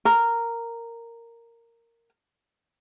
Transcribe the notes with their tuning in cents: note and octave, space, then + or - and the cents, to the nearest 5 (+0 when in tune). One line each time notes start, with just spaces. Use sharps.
A#4 -10